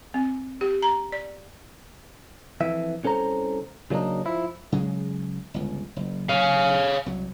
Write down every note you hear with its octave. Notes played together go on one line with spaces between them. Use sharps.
C4
G4
A#5
D5
F2 E3 E5
C2 C#4 A4 C5 A#5
C#3 F#3 A#3 D4 D#4
F3 E4
C#3 F#3 G#3
G1 C#2
F#1
C#5 F5
C2 F#3